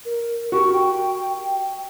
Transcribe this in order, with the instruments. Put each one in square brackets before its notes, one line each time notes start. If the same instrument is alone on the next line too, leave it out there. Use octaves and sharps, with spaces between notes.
[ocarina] A#4
[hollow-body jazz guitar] F#4 G4 A#4 [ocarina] C#6
[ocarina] G5